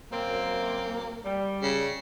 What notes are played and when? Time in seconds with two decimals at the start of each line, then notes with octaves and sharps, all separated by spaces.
0.12 F#2 A#3 C4
1.24 G3
1.62 C#3